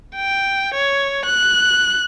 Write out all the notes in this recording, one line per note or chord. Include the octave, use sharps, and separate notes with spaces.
G5
C#5
F#6